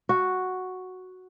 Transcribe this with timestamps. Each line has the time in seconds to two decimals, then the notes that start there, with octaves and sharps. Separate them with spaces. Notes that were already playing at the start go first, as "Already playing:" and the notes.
0.09 F#4